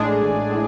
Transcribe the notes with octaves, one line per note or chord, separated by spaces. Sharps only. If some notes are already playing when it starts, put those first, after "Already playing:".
Already playing: A1 A2 G#3 D4 G#4
A1
A2